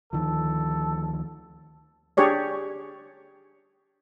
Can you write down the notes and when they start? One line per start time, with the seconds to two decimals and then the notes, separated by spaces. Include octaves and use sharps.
0.13 D2 D#3 F3 A4
2.17 D4 G4 G#4 C#5 D5